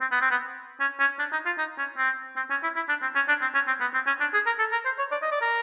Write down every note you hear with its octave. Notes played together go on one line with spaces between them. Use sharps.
C4
B3
C4
B3
C#4
C#4
D4
D#4
F4
D#4
C#4
C4
C4
C#4
E4
E4
D4
C4
C#4
D4
C4
C#4
C4
B3
C4
C#4
D4
G#4
A#4
A4
A#4
C5
C#5
D5
D#5
D5
A#4